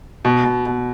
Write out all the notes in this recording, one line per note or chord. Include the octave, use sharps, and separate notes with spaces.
B2
B2
B2